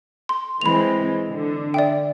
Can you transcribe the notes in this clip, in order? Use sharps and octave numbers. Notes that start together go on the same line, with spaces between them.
C6
E3 G#3 C4 B5 F7
D3
D5 E5 G5